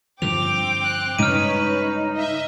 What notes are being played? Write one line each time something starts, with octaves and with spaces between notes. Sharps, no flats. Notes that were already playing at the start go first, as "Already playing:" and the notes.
G2 D3 F3 C4 G5 D6 F7
F#6
G2 C#3 G#3 C#4 D#4 B4 F6 D#7
D#5 E5